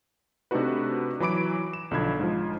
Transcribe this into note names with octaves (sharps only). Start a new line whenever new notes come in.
C3 A3 D4 D#4 F#4 B4
E3 F#3 B5 D6 D7
E7
B1 D3 F3 B5 G#6
G#2 F3